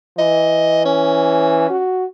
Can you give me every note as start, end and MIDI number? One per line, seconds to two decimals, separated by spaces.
0.18 1.69 52
0.18 0.85 75
0.85 1.83 61
1.70 2.05 66